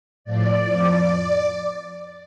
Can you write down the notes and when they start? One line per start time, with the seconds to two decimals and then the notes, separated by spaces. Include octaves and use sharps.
0.24 A2 F3 D5
0.68 F2 F3